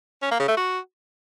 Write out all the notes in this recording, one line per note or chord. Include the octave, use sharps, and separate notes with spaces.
C#4
A#3
C#3
A3
F#4